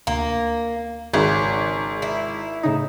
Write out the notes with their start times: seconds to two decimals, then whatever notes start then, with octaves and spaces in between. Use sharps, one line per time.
0.07 D2 A#3
1.13 G#1 C#3
2.02 E4
2.63 A2 C#3 D#4